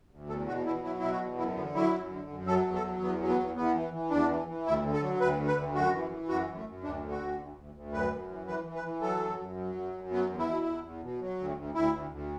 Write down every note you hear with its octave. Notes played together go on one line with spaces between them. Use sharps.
D2
E2 A4
B2 F#4
B2 E4
F#3 E4
B2 E4
F#4
E2
F#2 E4
D3 B3
F#3 E4
F#2
D3
F#2
F#3 A4
E2
A4
F#3
E2 B3
F#3
B3
E2
E2 B3
E3
E3
E2 D4
E3
E3
D2 E4
D3
A4
F#3
D2 B4
D3
B4
D2
F#2 F#4
E3
E3
F#2 F#4
F#2
A3
F#2
D2 D4
D3
F#4
D2
D2
D2
D2
F#2 B4
F#2
E3
E3 B4
E3
B4
E3
F#3 A4
F#2
F#2
F#3
F#2
F#2
F#3 B3
E2
E4
B2
E2
E2
B2
F#3
D2
D2
D2 E4
D2
D2